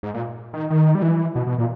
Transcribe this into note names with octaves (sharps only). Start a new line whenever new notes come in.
G#2
A#2
D#3
D#3
G3
E3
B2
B2
A#2